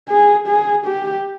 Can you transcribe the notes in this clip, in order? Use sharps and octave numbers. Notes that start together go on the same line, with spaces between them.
G#4
G#4
G4